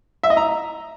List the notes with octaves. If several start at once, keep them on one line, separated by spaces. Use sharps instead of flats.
E5
D#5
A#5